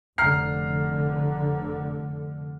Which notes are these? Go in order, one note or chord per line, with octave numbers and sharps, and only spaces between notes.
F1 D3 A#5 F6 C7